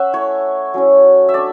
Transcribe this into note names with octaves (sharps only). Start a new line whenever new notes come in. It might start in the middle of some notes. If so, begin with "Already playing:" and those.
Already playing: C#4 E5 F#5
A3 E4 C#5
F#3 C#4 E4
E5
A3 D4 D5